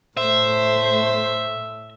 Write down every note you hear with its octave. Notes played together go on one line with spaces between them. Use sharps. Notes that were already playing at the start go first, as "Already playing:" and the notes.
A2 A3 C5 E5